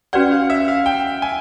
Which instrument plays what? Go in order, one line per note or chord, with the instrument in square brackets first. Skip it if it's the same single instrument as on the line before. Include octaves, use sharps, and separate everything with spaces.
[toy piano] C#4 F#4 B4 D5 G5 [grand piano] F#5
[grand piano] F5
E5
F5
G5
G#5